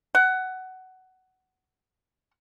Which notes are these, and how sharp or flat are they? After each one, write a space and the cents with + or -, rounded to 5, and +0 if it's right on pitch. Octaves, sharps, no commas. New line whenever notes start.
F#5 +15